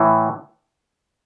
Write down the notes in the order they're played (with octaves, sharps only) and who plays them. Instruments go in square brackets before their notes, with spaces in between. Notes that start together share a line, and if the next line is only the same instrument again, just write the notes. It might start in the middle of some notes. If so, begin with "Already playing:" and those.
Already playing: [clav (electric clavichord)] A2 E3